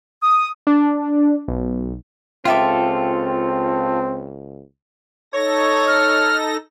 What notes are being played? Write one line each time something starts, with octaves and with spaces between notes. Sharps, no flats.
D#6
D4
B1
C#2 C4 F4 G4 A4 E5 D6
D#4 A4 C#5 A#6
F6